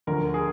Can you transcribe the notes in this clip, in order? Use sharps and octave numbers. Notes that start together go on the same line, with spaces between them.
D2 D3 F3 A#4
G#4